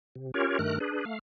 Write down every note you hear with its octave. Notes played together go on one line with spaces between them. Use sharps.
C3
C#4 F4 G4 A#4 C#5
G2 D#3 A3 A#4 F#6
D4 G#4 B4
A3 F5